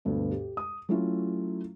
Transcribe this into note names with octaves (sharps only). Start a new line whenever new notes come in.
D2 G2 B2
G4
D#6
F#3 A3 C#4 E4 F4